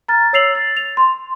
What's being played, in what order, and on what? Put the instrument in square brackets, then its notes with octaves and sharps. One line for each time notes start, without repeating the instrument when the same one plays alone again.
[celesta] A#5 F6 A6
C#5 E6 C7 F7 F#7
A6
F7
C6